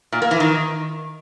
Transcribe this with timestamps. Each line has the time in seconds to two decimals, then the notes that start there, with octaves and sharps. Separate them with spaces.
0.12 A#2
0.22 A#3
0.31 E3
0.40 D#3